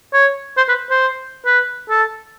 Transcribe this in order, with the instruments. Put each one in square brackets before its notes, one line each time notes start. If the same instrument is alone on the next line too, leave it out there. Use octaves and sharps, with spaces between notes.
[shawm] C#5
C5
B4
C5
B4
A4